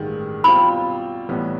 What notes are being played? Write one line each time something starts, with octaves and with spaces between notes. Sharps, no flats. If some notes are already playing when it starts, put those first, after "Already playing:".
Already playing: A1 G2 D#3 G#3
B2 G3 C4 F4 B5
B1 A2 E3 G3 B3